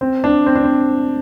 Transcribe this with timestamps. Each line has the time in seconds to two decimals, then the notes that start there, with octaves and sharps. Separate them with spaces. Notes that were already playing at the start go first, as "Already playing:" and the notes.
0.01 C4
0.24 D4
0.46 C4
0.55 D4
0.64 C4